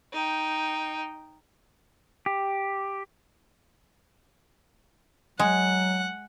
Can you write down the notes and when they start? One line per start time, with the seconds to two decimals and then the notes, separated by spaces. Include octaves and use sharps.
0.12 D#4 G5
2.26 G4
5.39 F#3 G#3 F#5